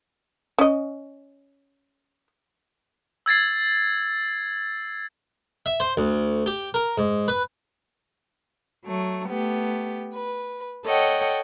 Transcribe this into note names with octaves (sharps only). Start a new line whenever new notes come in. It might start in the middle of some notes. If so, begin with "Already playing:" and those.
C#4 D#5
E6 G#6 A6 C7
E5
C5
D2
G4
A#4
G#2
B4
F#3 A3
A3 B3 G4
B4
A4 C#5 D#5 F#5 G5